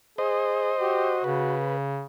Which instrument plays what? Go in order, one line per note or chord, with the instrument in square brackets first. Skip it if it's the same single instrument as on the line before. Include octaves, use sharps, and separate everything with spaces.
[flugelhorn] G#4 [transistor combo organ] C5 D#5
[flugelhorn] F#4 [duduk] G4
[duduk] C#3 [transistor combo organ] B4